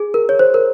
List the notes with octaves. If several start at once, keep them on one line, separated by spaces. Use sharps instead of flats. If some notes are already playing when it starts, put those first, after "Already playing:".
Already playing: G#4
A#4
C#5
C5
A#4